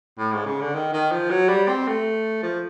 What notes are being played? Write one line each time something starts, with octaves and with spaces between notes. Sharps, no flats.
A2
G#2
C#3
D3
D#3
D#3
F3
F#3
G3
C4
A3
F3